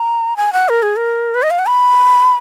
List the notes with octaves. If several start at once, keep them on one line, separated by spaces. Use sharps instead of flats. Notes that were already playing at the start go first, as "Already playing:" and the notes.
Already playing: A#5
G#5
F#5
A#4
G#4
A#4
B4
D#5
F5
F#5
B5